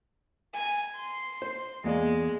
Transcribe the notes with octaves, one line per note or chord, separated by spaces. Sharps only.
G#5
C6
C5
E2 G#3 A#3 D5